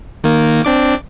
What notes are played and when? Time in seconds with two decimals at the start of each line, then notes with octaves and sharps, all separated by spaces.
0.24 D#3 A#3
0.65 C4 D4 D6